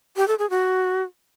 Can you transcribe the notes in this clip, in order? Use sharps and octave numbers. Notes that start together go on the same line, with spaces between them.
G4
A4
G#4
F#4